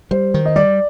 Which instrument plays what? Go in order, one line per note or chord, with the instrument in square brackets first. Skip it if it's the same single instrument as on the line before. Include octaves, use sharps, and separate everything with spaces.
[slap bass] G3 [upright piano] C5
[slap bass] D#3
[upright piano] D#5
[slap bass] G3 [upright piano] D5